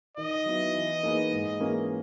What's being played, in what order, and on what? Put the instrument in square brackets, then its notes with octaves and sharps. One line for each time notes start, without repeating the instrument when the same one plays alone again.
[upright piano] D#3 [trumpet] D#5
[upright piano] F#3 B3 E4
E3
A#3 D#4 G#4 B4
G#2
E3 A#3 C#4 G#4